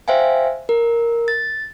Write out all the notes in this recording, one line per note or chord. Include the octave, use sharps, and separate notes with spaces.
C5 E5 F5 G5 G#5
A#4
A6